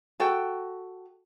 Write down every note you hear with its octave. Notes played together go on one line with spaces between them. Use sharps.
F#4 A4 G5